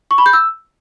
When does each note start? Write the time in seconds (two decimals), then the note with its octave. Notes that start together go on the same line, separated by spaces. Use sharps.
0.11 C#6
0.18 B5
0.26 G6
0.33 E6